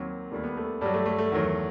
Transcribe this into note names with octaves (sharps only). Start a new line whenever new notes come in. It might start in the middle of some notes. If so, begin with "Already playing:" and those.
Already playing: D#2 D#3 F#3 C4
D#2 D#3 G3 A3
B3
A3
G2 F#3 G3
A3
A3
A3
E2 D#3 F#3